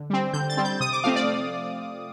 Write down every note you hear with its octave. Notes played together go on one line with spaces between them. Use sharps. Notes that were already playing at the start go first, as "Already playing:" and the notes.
Already playing: D3
G3 C4
D3 G6
A6
G3 C4
G6
C3 D#6
D6
F3 A3 C4 F5
D5